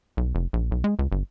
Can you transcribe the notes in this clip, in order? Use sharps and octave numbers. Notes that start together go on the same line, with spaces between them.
B1
F1
A#1
B1
G#3
C#2
G1